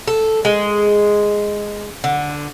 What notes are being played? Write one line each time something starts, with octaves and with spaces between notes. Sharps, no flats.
A4
G#3
D3